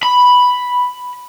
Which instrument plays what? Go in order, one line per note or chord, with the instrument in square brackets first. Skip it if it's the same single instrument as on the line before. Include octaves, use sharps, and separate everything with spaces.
[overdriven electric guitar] B5